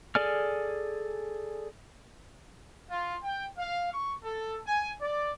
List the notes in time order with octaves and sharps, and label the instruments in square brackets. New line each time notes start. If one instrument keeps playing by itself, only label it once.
[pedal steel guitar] G#4 A4 D5 G#5 F6
[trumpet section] F4
G5
F5
C#6
A4
G#5
D5